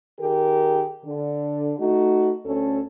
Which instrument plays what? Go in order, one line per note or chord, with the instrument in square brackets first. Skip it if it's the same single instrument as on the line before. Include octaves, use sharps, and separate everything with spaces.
[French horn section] D#3 G4 G#4 A#4
D3
A3 D#4 F#4
D2 C#4 A4